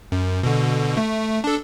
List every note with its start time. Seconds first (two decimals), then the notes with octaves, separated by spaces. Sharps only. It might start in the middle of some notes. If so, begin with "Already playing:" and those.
0.12 F#2
0.43 B2 D3
0.97 A3
1.44 D4 A4